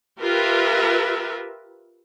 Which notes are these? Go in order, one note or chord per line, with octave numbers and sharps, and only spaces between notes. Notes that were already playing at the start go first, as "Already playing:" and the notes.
F4 G4 A#4 B4 E5